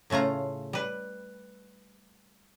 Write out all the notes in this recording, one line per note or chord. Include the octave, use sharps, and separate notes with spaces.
A2 C#3 A3 F4 A#5
G3 B4